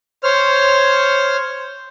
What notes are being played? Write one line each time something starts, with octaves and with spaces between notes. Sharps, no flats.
C5 C#5 F6